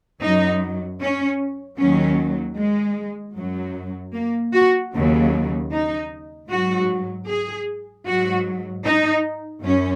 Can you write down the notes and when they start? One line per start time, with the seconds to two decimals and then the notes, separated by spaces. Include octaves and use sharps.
0.22 F#2 F#3 D#4
1.00 C#4
1.78 D#2 D#3 F#3 C#4
2.57 G#3
3.35 F#2 F#3
4.13 A#3
4.54 F#4
4.92 D#2 C#3 F#3
5.71 D#4
6.49 G#2 F#3 F#4
7.28 G#4
8.06 G#2 F#3 F#4
8.84 D#4
9.63 F#2 C#4